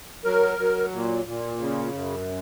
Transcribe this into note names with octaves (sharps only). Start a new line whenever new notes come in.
F#3 A#4
F#3
A#2
A#2
C#3
F#2